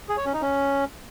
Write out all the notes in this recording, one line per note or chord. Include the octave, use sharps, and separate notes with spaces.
G#4
C#5
C#4
D#4
C#4